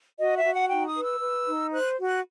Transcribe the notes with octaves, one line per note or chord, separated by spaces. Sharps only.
F#4 D#5
E5
F#4
F#5
D#4 G5
D#6
B4
E6
B4
D#4
C5 F#6
F#4
F#6